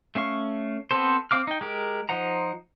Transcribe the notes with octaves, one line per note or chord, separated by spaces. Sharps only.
A3 C#4 F5 C#6
B3 C4 A4 C5
C4 F5 D6 F6
D#4 G5
G#3 G4 A#4
F3 D#4 C5 F#5 A#5